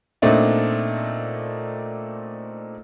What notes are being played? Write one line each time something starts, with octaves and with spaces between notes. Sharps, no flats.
A#2 A3 C4 D4 D#4